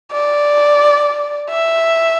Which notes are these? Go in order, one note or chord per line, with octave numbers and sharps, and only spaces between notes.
D5
E5